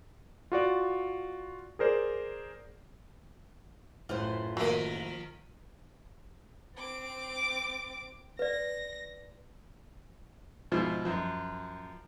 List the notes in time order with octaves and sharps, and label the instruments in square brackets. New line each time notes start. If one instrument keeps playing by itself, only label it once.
[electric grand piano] F4 F#4 D5
G#4 A#4 C5 D5
[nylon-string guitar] F#2 A2 E3 [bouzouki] F4 B4 C5
[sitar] D#3 F3 A#4 [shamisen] F#3 A#3
[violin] C4 D6
[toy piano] B4 D5 [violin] A#6
[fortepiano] G#2 B2 F3 E4 F4
F#2 F3